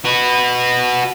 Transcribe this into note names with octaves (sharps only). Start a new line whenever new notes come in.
F#4 B4